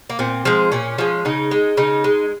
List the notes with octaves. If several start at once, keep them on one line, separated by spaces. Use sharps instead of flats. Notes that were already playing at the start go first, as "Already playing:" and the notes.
A#3
A#2 C4
F3 G#3
A#2 C#4
F3 G#3
C#3 D#4
G#3
C#3 D#4
G#3